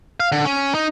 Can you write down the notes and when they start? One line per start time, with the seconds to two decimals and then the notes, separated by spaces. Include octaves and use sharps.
0.20 F5
0.32 D3
0.45 C#4
0.75 D#4